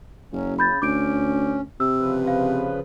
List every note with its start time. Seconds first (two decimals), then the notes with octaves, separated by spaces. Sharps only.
0.32 F#1 F#3 C#4
0.59 C#3 B5 G6 A6
0.82 D2 C#4 D6 G6 D7
1.80 C3 E6
2.00 C#3 F3 B4
2.27 F5